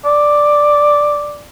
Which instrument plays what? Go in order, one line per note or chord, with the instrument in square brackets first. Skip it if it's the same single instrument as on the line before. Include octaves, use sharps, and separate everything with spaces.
[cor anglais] D5